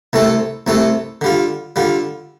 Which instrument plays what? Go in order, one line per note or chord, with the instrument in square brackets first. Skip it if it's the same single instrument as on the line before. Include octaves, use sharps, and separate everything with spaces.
[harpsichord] C2 C3 A3 C4 A4
C2 C3 A3 C4 A4
D3 G3 F4
D3 G3 F4